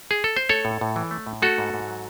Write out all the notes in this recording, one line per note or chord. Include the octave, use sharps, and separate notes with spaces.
G#4
A4
C5
A3 A4 C#5
A2
A2
E3
A3
A2
A3 F#4 A4
G#2
G#2
F#3